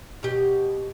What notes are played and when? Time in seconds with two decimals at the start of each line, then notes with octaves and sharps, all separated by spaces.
0.23 B2 G4